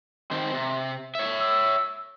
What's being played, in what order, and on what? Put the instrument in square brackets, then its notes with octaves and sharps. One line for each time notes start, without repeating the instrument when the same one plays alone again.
[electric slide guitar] D#3 C4 C5
C3
C#5 E5
[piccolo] E6